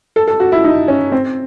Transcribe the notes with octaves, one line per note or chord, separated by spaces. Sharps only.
A4
A4
F#4
E4
D#4
C#4
C4